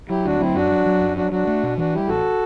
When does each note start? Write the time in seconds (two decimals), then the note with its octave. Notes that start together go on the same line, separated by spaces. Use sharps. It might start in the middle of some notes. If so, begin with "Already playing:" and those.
0.09 F#3 E4 G4
0.25 D2 D4 F#4
0.40 F#3 C4 E4
0.55 F#2 D4 F#4
0.71 F#3
0.86 F#3
1.01 F#2
1.16 F#3 D4 F#4
1.32 F#3 D4 F#4
1.47 A3
1.63 B2
1.78 E3 D4 F#4
1.93 G3 E4 G4
2.08 A1 F#4 A4